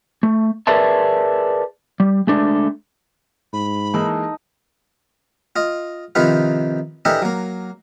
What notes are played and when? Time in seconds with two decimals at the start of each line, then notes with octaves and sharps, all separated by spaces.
0.23 A3
0.67 G#4 A#4 B4 D5 E5 A5
2.00 G3
2.27 G#3 A3 D4
3.53 G#2 B5
3.94 E3 G#3 A#3 D#4 A4
5.56 F4 D#5
6.15 C3 D#3 F3 D#4 F4 B4
7.05 E3 D4 G4 A4 A#4 D#5
7.22 F#3 A#3